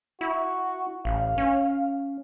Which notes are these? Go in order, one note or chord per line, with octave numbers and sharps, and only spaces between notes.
E4 F#4
A1 F5
C#4